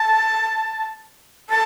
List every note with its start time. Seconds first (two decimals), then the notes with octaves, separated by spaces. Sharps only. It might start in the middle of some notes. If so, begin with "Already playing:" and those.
Already playing: A5
1.50 A5